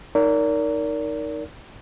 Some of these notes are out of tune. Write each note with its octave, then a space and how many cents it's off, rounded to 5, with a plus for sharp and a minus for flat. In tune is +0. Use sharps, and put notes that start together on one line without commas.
D#4 +0 A#4 -10 D5 -40